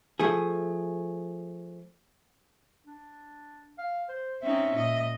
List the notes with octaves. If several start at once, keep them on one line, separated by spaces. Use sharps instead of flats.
F3 A3 G#4
D4
F5
C5
C4 C#4 D#4 E5
A#2 D#5